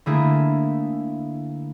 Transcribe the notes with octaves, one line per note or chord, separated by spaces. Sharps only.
D3 A3 A#3 E4 G#4